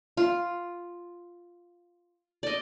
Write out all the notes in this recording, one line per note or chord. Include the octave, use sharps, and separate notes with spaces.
F4
D5 D#5